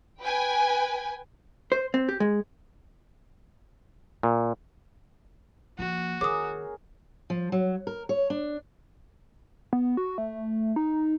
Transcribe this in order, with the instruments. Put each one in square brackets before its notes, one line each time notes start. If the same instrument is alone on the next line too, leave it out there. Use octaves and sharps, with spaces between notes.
[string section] B4 G5 G#5
[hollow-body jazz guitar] C5
C4
G4
G#3
[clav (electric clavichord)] A#2
[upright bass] F3 A#3 [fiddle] F#4
[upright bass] D#3 [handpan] G#4 A#4 C#5 [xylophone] D6 D#6
[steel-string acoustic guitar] F3
F#3
A#4
C#5
D4
[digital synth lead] B3
F#4
A3
D#4